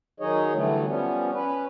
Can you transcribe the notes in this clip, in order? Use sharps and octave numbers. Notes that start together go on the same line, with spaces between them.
D#3 F#3 D#4 G#4 C#5 D#5
D3 E3 F#3 G3 A3
F3 G3 B3 C#4
C#4 B4